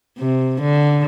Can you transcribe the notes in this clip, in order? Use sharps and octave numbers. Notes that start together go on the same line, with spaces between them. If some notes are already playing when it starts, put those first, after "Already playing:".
C3
D3